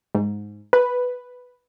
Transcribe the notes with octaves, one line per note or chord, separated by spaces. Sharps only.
G#2
B4